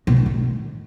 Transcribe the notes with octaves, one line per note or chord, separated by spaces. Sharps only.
B2
A2
D#3